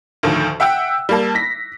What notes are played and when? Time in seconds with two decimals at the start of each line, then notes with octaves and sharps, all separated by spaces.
0.23 D2 A2 D#3 F3
0.60 E5 F#5 G5 E6
1.09 G3 A#3 A5
1.35 A#6 B6